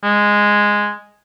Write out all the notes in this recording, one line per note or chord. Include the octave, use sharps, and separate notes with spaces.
G#3